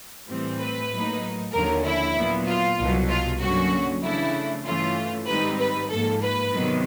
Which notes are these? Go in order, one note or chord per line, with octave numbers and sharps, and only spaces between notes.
A2 E3 G3 C4
B4
A2 F#3 A#3 D#4
D#2 D3 F3 A#3 C#4 A#4
E4
A#2 F#3 B3
F4
C2 B2 F#3
F4
G2 D3 F#3 A#3 C#4 F#4
C#3 E3 A3 D4 E4
G2 E3 A3 C#4 F4
G#2 D#3 G3 C4 D#4 B4
B4
G#2 F3 A#3 A4
B4
C3 D#3 F#3 B3